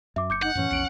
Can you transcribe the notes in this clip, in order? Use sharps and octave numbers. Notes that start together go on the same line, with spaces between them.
F#2 E5 D6
F#1 D6 G6 C#7
D#4 F#5 G6
F#2 A2 E3 C#4
A#1 E2 C#7 D7 F#7